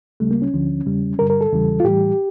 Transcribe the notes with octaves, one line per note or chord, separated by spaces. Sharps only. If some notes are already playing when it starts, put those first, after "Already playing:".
D2 C#3 G3 A3
A#3
C#4
D2 D3 F3
E2 C#3 G3
G2 D3 G3 A#4
A#4
A4
E2 C#3 E3 G3
F4
A2 E3 G3 G4